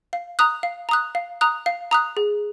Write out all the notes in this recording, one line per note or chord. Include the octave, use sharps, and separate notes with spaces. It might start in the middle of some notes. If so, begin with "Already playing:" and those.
F5
A#5 D#6 F#6
F5
A#5 D#6 F#6
F5
A#5 D#6 F#6
F5
A#5 D#6 F#6
G#4